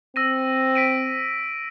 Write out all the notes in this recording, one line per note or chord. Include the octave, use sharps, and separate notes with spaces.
C4 E6 A#6 D#7
B6 D7 D#7